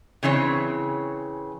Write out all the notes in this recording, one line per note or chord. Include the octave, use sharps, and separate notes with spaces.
C#3 E3 C4 C#5